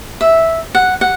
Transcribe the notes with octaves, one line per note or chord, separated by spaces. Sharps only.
E5
F#5
F#5